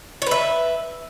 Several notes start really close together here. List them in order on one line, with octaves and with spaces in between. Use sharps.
C#5 B4 E5